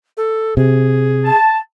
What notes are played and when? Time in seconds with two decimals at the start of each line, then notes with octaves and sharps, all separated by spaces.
0.17 A4
0.57 C3 G#4
1.25 A5